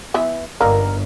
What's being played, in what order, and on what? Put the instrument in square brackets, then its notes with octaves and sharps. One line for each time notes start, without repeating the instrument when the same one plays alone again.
[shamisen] E3 B3 E5
[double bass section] G1 [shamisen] D3 D#3 A#3 [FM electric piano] A#4